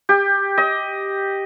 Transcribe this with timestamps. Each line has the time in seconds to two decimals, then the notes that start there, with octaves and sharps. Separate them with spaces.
0.09 G4
0.58 D#5